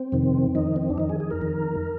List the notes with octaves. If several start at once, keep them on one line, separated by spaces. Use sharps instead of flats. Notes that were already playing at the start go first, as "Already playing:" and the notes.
Already playing: C4
F2 C3 D#3
F2 D#3 D#4
C4
D4
F2 D#3 D#4
G#4
G#4
A#4
F2 D#3